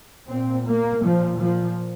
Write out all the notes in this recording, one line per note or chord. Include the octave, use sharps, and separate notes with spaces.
A#2 C4
A#3
A#2 F3
F3